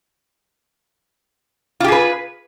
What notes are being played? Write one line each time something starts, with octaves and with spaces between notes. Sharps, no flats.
F4 G4 G#4 B4